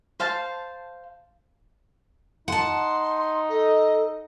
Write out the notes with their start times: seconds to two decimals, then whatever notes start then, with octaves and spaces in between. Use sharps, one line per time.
0.20 C5 F5 A5
2.48 D#4 F#5 A5 C6
3.49 A4 D#5